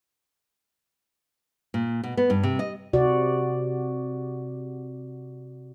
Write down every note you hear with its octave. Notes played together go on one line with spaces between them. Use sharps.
A#2
B2
B3
G2
C3
D#5
C3 F#4 D5